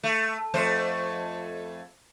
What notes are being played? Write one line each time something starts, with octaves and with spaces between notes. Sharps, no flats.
A3
F2 A3 C5